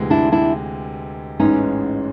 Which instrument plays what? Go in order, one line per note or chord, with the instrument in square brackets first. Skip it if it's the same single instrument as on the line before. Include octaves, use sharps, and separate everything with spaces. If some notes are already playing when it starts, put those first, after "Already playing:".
Already playing: [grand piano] D2 C3 E3 G#3
[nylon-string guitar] D4 E4
D4 E4
[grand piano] A1 G#2 E3 G#3 [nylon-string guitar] C#4 D#4